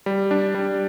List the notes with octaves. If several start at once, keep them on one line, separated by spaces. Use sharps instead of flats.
G3
D4
G3